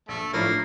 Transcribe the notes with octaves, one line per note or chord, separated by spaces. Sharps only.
A#1 A3
A2 F3 A3 A#3 D4